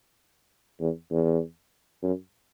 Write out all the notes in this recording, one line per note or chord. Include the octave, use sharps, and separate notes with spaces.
E2
E2
F#2